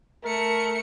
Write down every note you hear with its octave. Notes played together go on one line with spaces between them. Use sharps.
A3 A#4 C#7